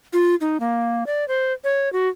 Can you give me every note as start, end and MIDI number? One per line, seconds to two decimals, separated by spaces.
0.13 0.35 65
0.41 0.57 63
0.60 1.04 58
1.06 1.27 74
1.28 1.53 72
1.64 1.91 73
1.93 2.08 66